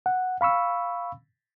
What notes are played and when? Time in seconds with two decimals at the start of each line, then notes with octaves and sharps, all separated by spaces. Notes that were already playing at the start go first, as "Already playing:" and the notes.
0.06 F#5
0.41 F5 B5 C#6 E6